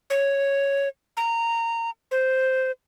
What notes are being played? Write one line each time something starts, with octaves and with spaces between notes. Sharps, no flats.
C#5
A#5
C5